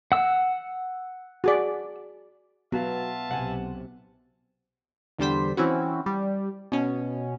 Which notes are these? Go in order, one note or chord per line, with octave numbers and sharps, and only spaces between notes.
F#5 E6
F#4 G#4 D5
F#3 B3 F4 B4 E5 F5 A5
B1 C3 F#5 G#5
E2 D3 G3 C5 B6
E3 C4 C#4 E4 F#4
G3
B2 C#4